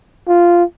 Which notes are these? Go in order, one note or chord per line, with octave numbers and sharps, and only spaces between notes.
F4